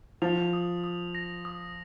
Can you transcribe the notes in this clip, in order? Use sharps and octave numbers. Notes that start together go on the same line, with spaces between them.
F3 F7
D#6
D#6
A#6
D#6